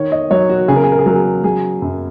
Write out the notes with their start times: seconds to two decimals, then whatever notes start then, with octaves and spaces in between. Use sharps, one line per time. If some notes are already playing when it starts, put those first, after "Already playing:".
Already playing: D#3 C#5
0.12 D#5
0.31 F#3 C#5
0.50 F#4
0.68 C#3 G#4
0.76 A#4
0.84 G#4
0.92 A#4
0.99 G#4
1.06 F#3 A#4
1.15 G#4
1.44 F#3 G#4
1.82 F#2